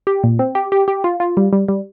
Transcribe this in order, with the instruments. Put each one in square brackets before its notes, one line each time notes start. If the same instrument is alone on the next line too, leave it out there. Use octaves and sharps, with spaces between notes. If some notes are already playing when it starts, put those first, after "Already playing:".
[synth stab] G4
A#2
C4
G4
G4
G4
F4
F4
G3
G3
G3